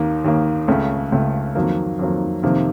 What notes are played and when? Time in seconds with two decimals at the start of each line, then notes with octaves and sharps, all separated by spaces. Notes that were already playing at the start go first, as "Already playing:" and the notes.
Already playing: D#2 D#3 A#3
0.24 D#2 D#3 A#3
0.67 C#2 C#3 A3
1.12 C#2 C#3 A3
1.55 F2 D#3 F#3 A#3
1.99 F2 D#3 F#3 A#3
2.43 F2 C3 D#3 A#3